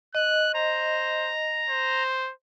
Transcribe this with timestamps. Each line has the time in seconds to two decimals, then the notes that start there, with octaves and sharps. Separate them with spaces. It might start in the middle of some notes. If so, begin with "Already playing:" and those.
0.15 D#5 F#6
0.54 C5 A#5
1.69 C5